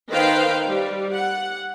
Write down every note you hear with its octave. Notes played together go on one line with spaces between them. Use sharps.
D#3 D#4 B4 C5 F5 G5
G3
F#5